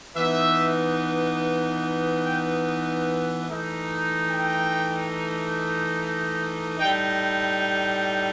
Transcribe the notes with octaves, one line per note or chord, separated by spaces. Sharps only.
E3 B3 D#4 E5
G5
E3 A3 D#4
G5
A2 G3 D#4 G5